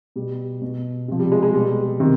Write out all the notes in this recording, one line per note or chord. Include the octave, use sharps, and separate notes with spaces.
B2 G3
B2
C3 F3
G3
G#3
G#3
B2 G3
C3 D#3